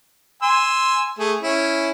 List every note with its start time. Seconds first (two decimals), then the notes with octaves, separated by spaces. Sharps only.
0.42 G#5 C6 E6
1.19 A3 G#4
1.43 C#4 E4